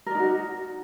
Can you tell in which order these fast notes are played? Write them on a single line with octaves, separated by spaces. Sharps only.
A#4 D5 D#4 F#4